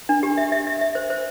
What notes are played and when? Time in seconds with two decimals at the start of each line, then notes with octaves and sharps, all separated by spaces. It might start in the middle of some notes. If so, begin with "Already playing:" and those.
0.09 D4
0.23 G4
0.37 E5
0.52 E5
0.67 E5
0.81 E5
0.95 C5
1.10 C5